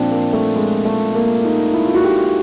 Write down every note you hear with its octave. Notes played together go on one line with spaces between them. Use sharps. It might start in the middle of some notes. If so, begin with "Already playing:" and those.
Already playing: A#2 F3 C4 D4
A#3
A3
G#3
A3
A#3
D#4
E4
F4
F#4
G4